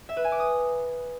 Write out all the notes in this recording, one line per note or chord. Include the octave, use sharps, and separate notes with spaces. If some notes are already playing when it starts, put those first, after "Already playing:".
E5
B4
G#5
D6
D#6